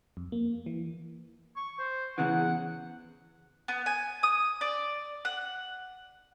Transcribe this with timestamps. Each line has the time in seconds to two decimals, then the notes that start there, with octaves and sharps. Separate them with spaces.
0.17 F2
0.32 A#3
0.66 E3
1.56 C#6
1.78 C5
2.18 E2 C#3 E3 F#5
3.68 B3
3.86 G#5
4.23 D#6
4.61 D5
5.25 F#5